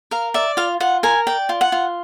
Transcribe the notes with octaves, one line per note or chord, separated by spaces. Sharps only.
A#4 F5
D5 E5
F4 F5
F4 F#5
A#4 G#5
D5 G5
F4
F#5
F4